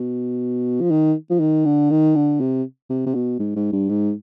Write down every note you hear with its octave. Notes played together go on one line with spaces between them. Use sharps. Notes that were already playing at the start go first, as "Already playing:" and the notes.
Already playing: B2
F3
D#3
F3
D#3
D3
D#3
D3
C3
C3
C3
B2
G#2
G#2
G2
G#2